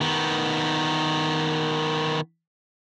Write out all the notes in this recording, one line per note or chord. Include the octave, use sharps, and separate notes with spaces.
D#3 B3